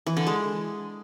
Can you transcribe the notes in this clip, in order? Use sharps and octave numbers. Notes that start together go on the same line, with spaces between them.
E3
D3
G#3